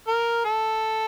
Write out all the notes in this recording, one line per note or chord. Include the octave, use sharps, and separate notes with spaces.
A#4
A4